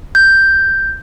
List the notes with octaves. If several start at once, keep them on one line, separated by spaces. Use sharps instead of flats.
G6